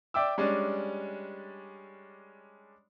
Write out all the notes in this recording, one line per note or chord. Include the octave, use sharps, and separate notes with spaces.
D5 E5 G5 D6 E6
G3 G#3 C#4 D4 D5